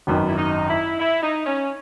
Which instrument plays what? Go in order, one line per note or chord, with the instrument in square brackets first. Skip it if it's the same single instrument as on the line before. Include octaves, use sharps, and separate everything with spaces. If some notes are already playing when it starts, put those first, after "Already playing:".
[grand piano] G#1 F#2 D#3 [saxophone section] B3
[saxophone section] E4
D#4
E4
E4
D#4
C#4